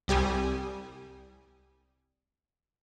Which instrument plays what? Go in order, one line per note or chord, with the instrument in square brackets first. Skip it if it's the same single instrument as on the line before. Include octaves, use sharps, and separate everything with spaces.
[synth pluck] C2 G3 G4 G#5 D#6